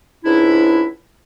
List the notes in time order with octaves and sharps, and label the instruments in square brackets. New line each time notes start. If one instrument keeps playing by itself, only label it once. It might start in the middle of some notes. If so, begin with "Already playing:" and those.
[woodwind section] C#2 G#2 D4 E4